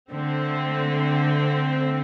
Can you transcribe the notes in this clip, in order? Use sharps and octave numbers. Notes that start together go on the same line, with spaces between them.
D3 A3 C4